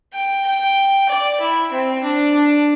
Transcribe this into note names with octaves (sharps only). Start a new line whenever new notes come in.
G5
G5
D5
E4
C4
D4
D4